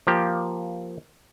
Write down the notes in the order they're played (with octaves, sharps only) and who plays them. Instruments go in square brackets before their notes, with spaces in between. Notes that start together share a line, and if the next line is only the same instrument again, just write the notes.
[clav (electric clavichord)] F3 A#3 G4